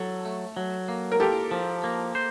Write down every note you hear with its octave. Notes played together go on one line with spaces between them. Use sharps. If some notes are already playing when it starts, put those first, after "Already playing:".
Already playing: F#3 A4
A3
F#3
A#3
A#4
F4 G4 A4
F3
A#3
C5